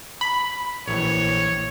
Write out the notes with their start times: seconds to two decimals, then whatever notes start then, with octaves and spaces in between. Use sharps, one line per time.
0.21 B5
0.88 A#1 E3 C#5